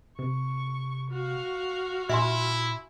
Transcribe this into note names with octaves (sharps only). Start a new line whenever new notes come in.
C3 C#6
F#4 F5
A#2 E4 E5 G#5 C6